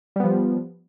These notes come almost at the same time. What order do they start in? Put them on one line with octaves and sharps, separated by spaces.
G3 B3 F3